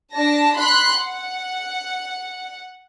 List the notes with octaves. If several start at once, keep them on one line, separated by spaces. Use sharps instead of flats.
D4 A5 A#6
B5 C6 F#6
F#5